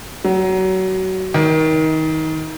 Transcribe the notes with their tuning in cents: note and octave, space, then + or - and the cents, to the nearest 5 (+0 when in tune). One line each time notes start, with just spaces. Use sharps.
F#3 +25
D#3 +25